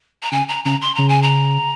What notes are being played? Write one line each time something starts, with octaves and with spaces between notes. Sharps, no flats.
A#5
C#3 G#5
A#5
C#3 A#5
C6
C#3 A#5
G#5
A#5